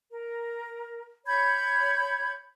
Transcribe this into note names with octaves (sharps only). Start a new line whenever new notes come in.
A#4
C#5 B5 G6 G#6